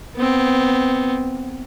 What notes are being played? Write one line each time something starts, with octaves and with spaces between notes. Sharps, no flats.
B3 C4